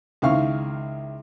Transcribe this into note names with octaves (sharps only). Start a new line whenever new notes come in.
C#2 D#3 E4 F5 C#6 F6